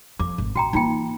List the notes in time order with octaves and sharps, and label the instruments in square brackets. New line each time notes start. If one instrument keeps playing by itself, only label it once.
[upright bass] F2 [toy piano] D6
[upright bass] G#1
[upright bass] A1 [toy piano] F#4 G5 A#5
[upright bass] E3 A#3 [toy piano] D#4 F4 G5